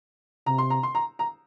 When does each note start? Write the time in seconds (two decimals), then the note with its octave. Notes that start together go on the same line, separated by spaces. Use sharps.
0.46 C3 A#5
0.58 C6
0.70 A#5
0.83 C6
0.95 A#5
1.19 A#5